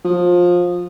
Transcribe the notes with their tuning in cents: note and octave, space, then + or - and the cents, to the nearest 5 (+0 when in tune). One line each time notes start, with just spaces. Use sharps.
F3 +20